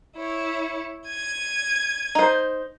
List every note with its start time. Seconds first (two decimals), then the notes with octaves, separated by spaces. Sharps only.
0.17 E4 C#5
1.07 G#6 D#7
2.15 D#4 C5